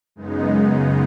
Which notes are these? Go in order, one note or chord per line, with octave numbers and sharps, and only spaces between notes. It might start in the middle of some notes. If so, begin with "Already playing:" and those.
F#2 C#3 G#3 B3 D#4